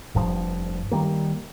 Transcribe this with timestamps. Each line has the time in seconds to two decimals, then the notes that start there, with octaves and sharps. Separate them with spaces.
0.15 F1 G2 F3
0.91 D#3 G3 A#3